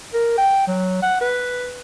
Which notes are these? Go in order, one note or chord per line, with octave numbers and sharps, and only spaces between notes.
A#4
G5
F#3
F#5
B4